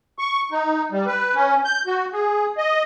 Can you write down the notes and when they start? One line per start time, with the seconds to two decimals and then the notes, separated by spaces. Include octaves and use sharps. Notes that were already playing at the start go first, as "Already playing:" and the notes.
0.19 C#6
0.52 D#4
0.92 G3
1.06 B4
1.35 C#4
1.65 G6
1.87 F#4
2.13 G#4
2.57 D#5